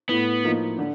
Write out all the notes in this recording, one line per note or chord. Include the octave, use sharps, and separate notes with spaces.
A2 B3
F3 A#3 D#4
D3